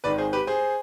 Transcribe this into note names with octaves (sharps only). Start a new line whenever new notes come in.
G#1 G#2 D#3 B4 D5
G#4 C5
G4 B4
G#4 C5